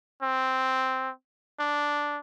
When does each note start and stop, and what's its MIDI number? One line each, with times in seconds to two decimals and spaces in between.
0.22 1.11 60
1.60 2.19 62